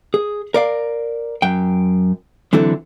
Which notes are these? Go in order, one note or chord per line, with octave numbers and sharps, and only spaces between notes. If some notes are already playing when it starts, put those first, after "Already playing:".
G#4
A#4 D5 F5
F#2 G5
D3 E3 F#3 C4 E4 A4